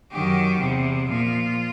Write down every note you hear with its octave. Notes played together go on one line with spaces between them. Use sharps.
F#2 D#3 F#3 G4
E2 C3 E3
A#2 F3 F4